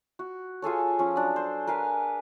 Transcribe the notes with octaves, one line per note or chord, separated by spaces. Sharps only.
F#4
F4 G#4 A4 C#5
F3 C#4
F#3 D4
C5
A#4 B4 F5 G#5